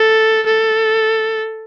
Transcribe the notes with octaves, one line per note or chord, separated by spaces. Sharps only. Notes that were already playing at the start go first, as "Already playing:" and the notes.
Already playing: A4
A4